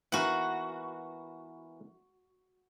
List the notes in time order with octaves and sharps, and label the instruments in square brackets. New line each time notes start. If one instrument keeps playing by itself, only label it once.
[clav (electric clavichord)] E3 B3 A#4 [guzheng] F#4 F#5